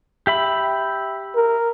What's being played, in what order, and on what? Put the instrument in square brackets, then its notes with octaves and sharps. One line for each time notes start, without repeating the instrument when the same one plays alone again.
[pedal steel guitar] G4 E5 B5
[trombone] A#4